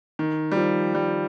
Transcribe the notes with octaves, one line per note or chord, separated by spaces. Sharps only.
D#3
G3
F3
G3